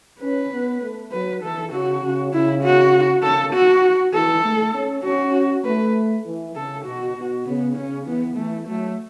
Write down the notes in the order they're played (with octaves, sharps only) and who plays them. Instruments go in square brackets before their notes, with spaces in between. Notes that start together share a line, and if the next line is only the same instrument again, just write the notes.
[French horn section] C#4 [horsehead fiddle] B4
[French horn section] B3
A3
[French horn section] F#3 [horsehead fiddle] B4
[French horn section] E3 [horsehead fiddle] A4
[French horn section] C#3 [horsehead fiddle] F#4
[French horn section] C#3
[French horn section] C#3 [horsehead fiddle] E4
[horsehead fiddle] F#4
[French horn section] C#3 [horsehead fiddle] A4
[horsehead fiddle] F#4
[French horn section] E3 [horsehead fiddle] A4
[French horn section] A3
C#4
[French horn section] C#4 [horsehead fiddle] F#4
[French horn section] A3 [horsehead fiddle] B4
[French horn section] E3
[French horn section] C#3 [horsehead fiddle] A4
[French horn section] B2 [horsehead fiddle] F#4
[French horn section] B2
[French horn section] C#3 [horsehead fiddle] B3
[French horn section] C#3 [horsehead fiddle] C#4
[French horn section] E3 [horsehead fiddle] B3
[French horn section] E3 [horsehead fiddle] A3
[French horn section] F#3 [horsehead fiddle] A3